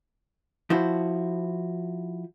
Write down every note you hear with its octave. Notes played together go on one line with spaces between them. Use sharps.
F3 E4 F#4 C5